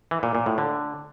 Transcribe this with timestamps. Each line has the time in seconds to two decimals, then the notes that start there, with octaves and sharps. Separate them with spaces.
0.11 E3
0.23 A#2
0.35 A#2
0.46 A2
0.58 D3